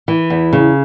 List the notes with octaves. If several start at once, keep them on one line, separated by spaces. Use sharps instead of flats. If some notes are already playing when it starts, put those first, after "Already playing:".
E3
E2
C#3